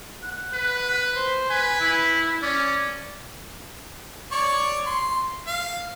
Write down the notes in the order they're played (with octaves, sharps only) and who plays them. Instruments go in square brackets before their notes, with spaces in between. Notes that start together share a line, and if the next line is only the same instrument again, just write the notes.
[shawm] F#5
[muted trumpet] B4
[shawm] C5
[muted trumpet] B4 [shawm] G#5
[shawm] E4
[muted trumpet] C#4 [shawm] D5
[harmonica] C#5 D5 C#6
C6
F5